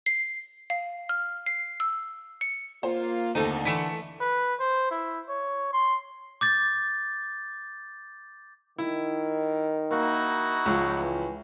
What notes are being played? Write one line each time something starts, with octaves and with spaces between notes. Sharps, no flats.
C7
F5
F6
C7
E6
C#7
A#3 F4 C5
D#2 D3 A3 C4 D#4 A4
E3 A3 B6 C#7 E7
B4
C5
E4
C#5
C6
D6 G6 A6
D#3 E4
A#3 D#4 E4 F#4
C#2 F3
E3